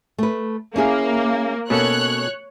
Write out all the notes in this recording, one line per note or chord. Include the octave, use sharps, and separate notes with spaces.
A3 B4
A#3 C#4 E4 G#4
B2 A#3 C#4 A4 C#5 F#6